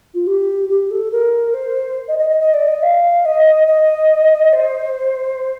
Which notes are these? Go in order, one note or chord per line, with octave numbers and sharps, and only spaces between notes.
F4
G4
G4
A4
A#4
C5
D#5
D#5
D#5
D#5
D5
D#5
F5
D#5
D#5
C5